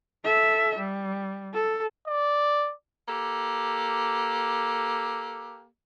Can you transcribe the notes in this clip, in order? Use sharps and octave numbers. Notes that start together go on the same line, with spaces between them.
A4 E5
G3
A4
D5
A#3 G4 A4